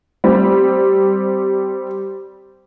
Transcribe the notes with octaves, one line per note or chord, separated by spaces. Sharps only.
G3 C4 G4